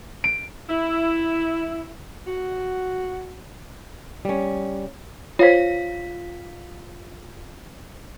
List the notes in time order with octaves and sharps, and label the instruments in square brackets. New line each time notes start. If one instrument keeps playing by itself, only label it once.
[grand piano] D7
[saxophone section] E4
F#4
[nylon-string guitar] G3 C#4
[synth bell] F4 F5 B6 [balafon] C5 C#5